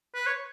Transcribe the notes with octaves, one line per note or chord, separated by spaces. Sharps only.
B4
C#5